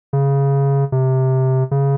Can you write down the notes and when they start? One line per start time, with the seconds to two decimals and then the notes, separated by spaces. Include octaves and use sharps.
0.13 C#3
0.92 C3
1.71 C#3